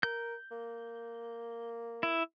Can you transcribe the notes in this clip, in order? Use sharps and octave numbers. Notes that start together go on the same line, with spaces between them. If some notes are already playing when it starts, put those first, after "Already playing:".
A#4 G6
A#3
E4